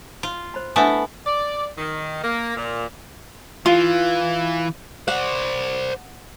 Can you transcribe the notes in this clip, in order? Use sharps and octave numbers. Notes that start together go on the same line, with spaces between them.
F4
C5 B5
A3 B3 D4 E4 E5 G#5
D5
D#3
A#3
A#2
E3 F4
C5 D5 F#5